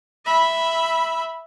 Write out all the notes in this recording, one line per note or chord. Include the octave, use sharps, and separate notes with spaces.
E5 B5